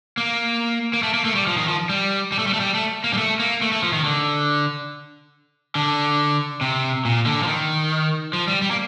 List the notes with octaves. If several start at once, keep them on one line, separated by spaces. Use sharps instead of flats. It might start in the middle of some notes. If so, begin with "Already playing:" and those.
A#3
A#3
A3
A#3
A3
G3
F3
D#3
F3
G3
G3
A3
G3
A3
G3
A3
A#3
G3
A3
A#3
A3
A3
F3
D#3
D3
D3
C3
A#2
D3
F3
D#3
F3
G3
G3
A#3